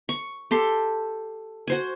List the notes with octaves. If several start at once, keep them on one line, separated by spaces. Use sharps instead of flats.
C#6
G4 A4 C6
F#4 C5 G#5